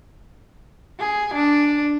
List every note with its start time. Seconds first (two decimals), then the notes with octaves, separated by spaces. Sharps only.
0.99 G#4
1.34 D4